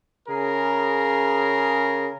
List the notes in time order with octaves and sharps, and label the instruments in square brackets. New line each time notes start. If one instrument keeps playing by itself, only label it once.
[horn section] C#3 G#4 A#4